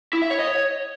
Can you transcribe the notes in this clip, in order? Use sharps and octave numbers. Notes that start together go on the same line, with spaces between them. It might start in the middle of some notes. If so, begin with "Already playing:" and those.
E4
E5
C#5
D#5
C#5